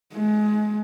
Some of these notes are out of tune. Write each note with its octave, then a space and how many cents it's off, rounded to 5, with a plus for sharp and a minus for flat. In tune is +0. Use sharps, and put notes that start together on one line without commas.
G#3 +30